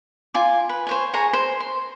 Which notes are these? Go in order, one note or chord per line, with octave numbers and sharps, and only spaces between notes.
F4 G#5 D6
B4
C5 C#5 G#5
G#4 C#5 G#5 A#5
C5
C6